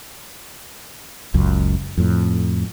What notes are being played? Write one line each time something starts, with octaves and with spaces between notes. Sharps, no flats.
F#1 C#2 F#2
F2 A2